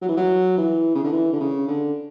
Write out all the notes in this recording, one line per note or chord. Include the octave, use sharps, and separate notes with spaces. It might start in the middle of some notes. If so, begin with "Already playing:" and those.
F#3
E3
F#3
E3
C#3
D3
E3
D3
C#3
D3